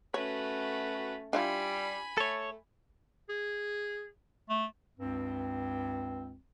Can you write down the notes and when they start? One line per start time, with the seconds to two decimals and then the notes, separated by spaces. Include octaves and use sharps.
0.14 A3 C#4 F#4 B4 C#5
1.33 G3 D4 E4 F4 G#5 B5
2.18 A3 A4 C#5
3.29 G#4
4.50 A3
4.98 C#2 G2 C4